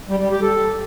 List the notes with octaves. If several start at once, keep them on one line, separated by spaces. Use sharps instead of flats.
G3
G3
G4
A4